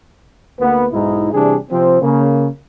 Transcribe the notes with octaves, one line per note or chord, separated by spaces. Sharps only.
D2 A#3 B3
B1 G#2 D#4 E4
C3 E3 G3 D4 G#4
C3 F3 C4
C#3 A#3